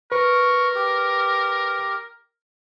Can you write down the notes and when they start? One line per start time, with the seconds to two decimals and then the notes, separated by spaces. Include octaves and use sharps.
0.12 A#4 B4 C#6
0.75 G4